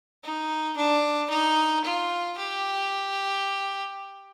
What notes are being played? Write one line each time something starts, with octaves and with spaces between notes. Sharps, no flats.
D#4
D4
D#4
F4
G4